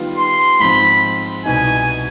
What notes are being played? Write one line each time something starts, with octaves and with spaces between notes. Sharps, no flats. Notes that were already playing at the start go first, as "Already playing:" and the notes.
Already playing: D#3 G3 B3 F4
C6
G#2 F3 C4 B5
C2 B2 B3 D#4 B4 G#5